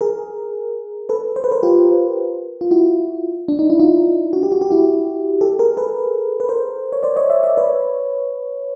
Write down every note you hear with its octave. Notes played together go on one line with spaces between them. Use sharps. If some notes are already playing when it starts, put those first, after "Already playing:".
G#4 A#4
A4 B4
C5
B4
A#4 C5
F4 G4
F4
E4 F#4
D4
D#4
E4
D#4 F4
F#4
G4
F#4
G4
E4 F#4
G4 A4
G#4 A#4
A4 B4
B4
A#4 C5
C#5
C5 D5
C#5 D#5
D5 E5
D5 E5
B4 C#5